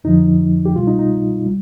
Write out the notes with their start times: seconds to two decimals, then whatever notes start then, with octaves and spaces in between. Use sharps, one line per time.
0.04 F2 D3 F3 D#4
0.65 G4
0.75 C2 B2 G3 F4
0.87 D#4
0.99 D#4
1.46 G3